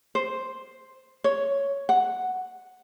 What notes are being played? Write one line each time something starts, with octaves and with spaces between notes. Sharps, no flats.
C5
C#5
F#5